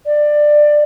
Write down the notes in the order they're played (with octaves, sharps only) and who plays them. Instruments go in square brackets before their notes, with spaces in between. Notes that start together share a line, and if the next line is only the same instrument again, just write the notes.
[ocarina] D5